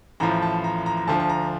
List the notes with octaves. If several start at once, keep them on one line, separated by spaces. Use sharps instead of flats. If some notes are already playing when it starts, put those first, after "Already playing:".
A1 A2 F3 A#5
A5
A#5
A#5
A#5
D2 D3 F3 A5
A5
A#5